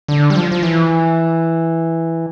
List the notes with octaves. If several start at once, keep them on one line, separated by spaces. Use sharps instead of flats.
D3
G3
F3
F3
E3